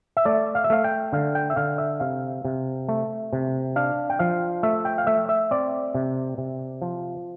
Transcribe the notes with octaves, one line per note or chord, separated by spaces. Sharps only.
E5
A3 D5
F5
E5
A3 F5
G5
D3 F5
G5
E5
D3 F5
E5
C3 F5
C3
A3
C3
D4 F5
G5
F3 F5
A3 E5
G5
F5
A3 E5
E5
C4 D5
C3
C3
F3